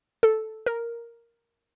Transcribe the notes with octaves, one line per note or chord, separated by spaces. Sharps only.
A4
A#4